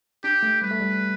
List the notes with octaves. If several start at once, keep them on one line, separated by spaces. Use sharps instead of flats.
D4 G4
A3
G3 B4
A3
G3